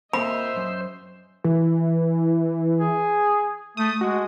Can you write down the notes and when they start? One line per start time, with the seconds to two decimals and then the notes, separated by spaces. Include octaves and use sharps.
0.13 A#2 A#3 C4 C5 D#5 E5 B5
0.57 F#2
1.44 E3
2.79 G#4
3.77 A3 D#6
4.01 G#3 F#4